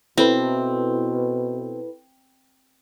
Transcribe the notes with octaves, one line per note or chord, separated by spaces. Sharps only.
B2 C4 E4 A4 B4